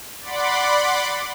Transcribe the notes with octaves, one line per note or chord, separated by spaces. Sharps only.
D5 F#5 B5 C6 D6